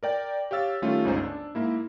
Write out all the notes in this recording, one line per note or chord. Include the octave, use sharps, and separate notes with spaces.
A#4 D5 G5
G4 C#5 F5 E6 A6
D#3 G3 A3 C#4 F4
G1 C#2 C#3 D#4 C5 G#5
D4
G#2 A#3 E4